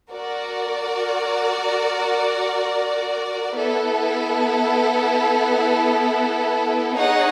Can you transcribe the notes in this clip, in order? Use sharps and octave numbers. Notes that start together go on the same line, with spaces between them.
F#4 A#4 D5
B3 E4 A4
D#4 G#4 C#5 F#5